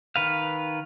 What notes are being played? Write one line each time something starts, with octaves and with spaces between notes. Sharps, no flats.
D#3 B4 F5